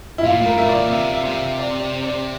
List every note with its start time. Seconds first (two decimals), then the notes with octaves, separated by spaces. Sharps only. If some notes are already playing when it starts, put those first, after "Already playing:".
0.18 E4
0.24 A#2 F4
0.41 A2 A#4
0.57 A2 E5
0.68 D5
0.75 A#2
0.91 C3 E5
1.13 E5
1.25 C3
1.35 E5
1.58 D5
1.80 D5
2.03 D5